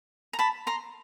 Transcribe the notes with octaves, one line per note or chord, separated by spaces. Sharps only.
A#5
A5 B5
A#5 C6